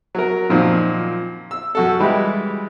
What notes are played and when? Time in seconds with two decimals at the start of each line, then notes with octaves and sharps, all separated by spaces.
0.15 F#3 A#4
0.50 F#2 A#2 D#3 F3 C4
1.51 E6
1.75 F#2 F#4 A4
2.00 E3 G3 G#3 E4 G4